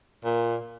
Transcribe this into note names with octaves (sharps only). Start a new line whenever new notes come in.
A#2